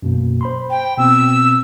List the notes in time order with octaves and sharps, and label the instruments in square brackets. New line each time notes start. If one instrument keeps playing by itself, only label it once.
[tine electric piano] F#2 B2 A#3
C5 B5 C6
[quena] G5
[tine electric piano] B2 B3 C4 [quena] E6